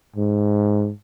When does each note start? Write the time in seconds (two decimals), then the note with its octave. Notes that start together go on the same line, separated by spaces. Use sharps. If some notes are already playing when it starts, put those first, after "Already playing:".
0.16 G#2